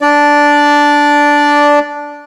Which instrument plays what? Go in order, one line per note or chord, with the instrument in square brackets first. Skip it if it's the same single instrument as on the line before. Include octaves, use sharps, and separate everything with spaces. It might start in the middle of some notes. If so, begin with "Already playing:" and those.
[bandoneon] D4 D5